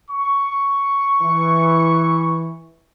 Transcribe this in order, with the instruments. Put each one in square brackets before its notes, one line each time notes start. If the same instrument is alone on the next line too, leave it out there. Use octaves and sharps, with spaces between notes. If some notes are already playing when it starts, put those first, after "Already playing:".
[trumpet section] C#6
[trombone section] E3